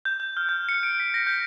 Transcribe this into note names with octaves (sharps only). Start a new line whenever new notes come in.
G6
G6
F6
G6
C#7
D7
B6
A#6
G6